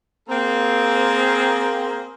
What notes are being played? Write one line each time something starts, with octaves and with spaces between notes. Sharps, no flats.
A#3 C4 G#4